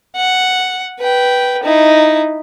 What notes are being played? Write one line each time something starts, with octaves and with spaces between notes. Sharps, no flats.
F#5
B4 G5
D#4 E4